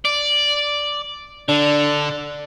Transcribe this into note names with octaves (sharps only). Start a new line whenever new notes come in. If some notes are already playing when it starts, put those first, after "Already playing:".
D5
D3 D4